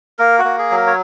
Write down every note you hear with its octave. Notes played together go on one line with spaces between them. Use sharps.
A#3 A#4
F#4
A#3
G#4
F#3
A#4
C#5